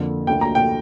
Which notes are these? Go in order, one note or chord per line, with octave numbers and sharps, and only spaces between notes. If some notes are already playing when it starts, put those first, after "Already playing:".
Already playing: F2 D3 F3 A#3
D2 D3 A#3 G5
A#5
G5